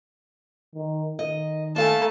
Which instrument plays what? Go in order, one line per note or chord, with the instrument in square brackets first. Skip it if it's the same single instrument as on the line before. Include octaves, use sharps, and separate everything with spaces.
[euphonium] D#3
[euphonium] D#3 [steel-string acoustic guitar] D#5
[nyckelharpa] A3 A5 [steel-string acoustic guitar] A#3 F5 G#5